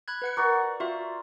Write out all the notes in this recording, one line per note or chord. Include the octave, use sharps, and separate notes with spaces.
B5 F#6 G#6
B4 F#5 C#7
F#4 A#4 D5
F4 F#4 E5